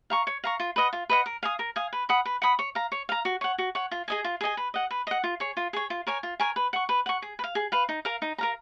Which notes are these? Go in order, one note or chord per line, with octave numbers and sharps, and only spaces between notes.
F5 A#5 C#6
C#5
F5 A#5 C#6
F4
B4 D#5 F#5
F4
B4 D#5 F#5
A#4
F5 G#5 D#6
A#4
F5 G#5 D#6
B4
F#5 B5 D#6
B4
F#5 B5 D#6
C#5
F5 A#5
C#5
F5 A#5
F#4
C#5 F#5
F#4
C#5 F#5
F4
G#4 D#5 G#5
F4
G#4 D#5 G#5
B4
D#5 F#5
B4
D#5 F#5
F4
G#4 C#5
F4
G#4 C#5
F4
A#4 C#5 G#5
F4
A#4 C#5 G#5
B4
F#5 C#6
B4
F#5 C#6
G#4
B4
F5
G#4
B4 F5
D#4
A#4 F5 A#5
D#4
A#4 F5 A#5